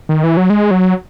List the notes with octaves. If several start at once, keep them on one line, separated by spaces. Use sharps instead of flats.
D#3
E3
F#3
G#3
F#3